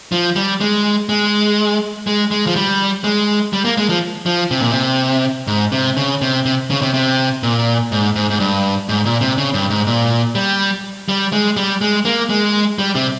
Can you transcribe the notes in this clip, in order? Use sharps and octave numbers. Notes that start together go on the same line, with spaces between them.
F3
G3
G#3
G#3
G#3
G#3
F3
G3
G#3
G3
A#3
G#3
F3
F3
C3
A#2
C3
G#2
C3
C#3
C3
C3
C#3
C3
C3
A#2
G#2
G#2
G#2
G2
G#2
A#2
C3
C#3
G2
G#2
A#2
G3
G3
G#3
G3
G#3
A#3
G#3
G3
C3